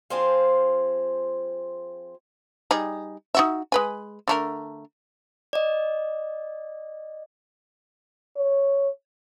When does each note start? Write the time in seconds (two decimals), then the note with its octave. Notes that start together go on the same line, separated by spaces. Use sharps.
0.10 F3 C4 G#4 C5 F5
2.71 G3 D#4 G#4
3.35 D#4 F#4 E5
3.72 G#3 B4 G#5
4.28 D3 A3 A#4
5.53 D5 D#5
8.37 C#5